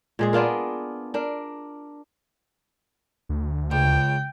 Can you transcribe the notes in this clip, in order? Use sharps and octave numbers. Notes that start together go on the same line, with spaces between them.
A#2 G#3 G#4
B3 D4 F4 A#4
D4 A#4
D2
C#2 G5